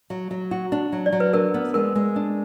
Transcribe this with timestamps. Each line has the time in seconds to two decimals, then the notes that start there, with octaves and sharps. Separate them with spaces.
0.10 F#3
0.31 F#3
0.51 F#4
0.72 D4
0.93 F#3
1.06 D5
1.12 F#3
1.20 B4
1.33 D4 A#4
1.54 B3
1.74 G#3 A#4
1.95 G#3
2.16 D4